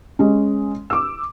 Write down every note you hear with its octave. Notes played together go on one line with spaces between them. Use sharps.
G#3 C#4
D6 E6